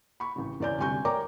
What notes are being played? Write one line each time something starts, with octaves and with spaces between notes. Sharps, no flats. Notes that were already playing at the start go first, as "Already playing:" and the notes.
B5 C#6
A1 C#3
E2 C#3 C#4 D5 G#5 G6
D2 C3 G3 G#5 C#6 G6
A#4 C#5 D5 G5 A#5 D6